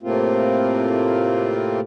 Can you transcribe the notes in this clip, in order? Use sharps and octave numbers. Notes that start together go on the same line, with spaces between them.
A2 C3 A3 A#3 C4 F4